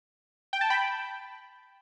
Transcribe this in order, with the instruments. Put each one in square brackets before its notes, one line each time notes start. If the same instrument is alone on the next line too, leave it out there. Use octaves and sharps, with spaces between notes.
[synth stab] G5
A5
G5 B5